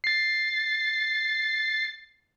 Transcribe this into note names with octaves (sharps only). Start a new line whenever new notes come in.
A6 C7